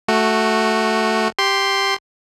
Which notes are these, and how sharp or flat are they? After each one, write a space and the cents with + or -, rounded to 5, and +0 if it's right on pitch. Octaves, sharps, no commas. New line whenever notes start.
A3 +0 F#4 +0
G4 +0 C6 +0